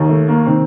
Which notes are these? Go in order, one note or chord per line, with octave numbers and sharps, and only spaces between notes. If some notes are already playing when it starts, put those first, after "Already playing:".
Already playing: D#2 D#3
A3
A#3
D#3 C4